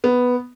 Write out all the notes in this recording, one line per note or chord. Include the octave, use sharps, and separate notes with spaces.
B3